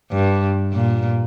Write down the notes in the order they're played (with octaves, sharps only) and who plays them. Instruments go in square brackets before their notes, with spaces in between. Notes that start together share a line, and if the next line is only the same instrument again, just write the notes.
[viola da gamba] G2
A#2